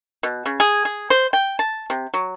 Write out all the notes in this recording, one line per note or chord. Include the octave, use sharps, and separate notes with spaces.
B2
C#3
G#4
G#4
C5
G5
A5
C3
F#3